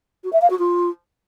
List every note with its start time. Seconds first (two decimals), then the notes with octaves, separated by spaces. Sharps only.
0.24 F#4
0.33 E5
0.42 F5
0.50 F#4
0.59 F4